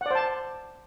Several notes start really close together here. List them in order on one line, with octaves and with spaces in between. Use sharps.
F#5 D5 C5 A5